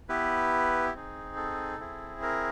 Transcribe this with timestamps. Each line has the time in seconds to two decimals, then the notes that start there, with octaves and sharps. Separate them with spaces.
0.09 B3 E4 G4 B4
0.94 C4 D#4 G#4
1.36 A4
1.80 C4 E4 G#4
2.22 A#4